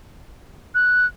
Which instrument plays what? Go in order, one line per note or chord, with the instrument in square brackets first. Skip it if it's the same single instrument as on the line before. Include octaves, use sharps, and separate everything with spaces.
[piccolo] F#6